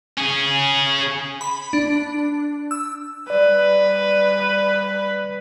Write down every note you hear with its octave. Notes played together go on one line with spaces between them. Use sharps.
C#4 G#4
B5
D4
E6
G3 B4 D5